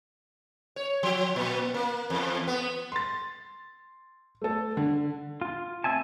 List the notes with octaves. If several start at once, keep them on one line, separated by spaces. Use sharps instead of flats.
C#5
F3
A#2
A#3
E2
B3
C6 A6
A3 A4
D3
F4
A3 C4 E5 G#5 A5